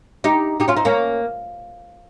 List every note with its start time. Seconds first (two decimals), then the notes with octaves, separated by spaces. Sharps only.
0.24 D#4 G4
0.60 D#4 G4
0.68 C#4 F4
0.76 C4 D#4
0.85 A#3 C#4